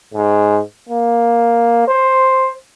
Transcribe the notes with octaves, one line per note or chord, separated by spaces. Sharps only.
G#2
A#3
C5